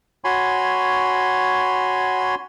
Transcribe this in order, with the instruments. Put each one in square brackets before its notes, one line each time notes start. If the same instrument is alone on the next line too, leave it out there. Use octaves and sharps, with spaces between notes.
[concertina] F#4 C#5 G#5 B5 C6